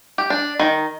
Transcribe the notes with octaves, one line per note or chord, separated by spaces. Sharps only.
G4
D4
D#3